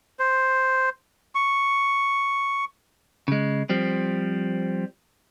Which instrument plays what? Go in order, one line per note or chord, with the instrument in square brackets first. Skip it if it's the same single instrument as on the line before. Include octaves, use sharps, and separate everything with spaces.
[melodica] C5
C#6
[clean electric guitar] C#3 G#3
F3 G3 C4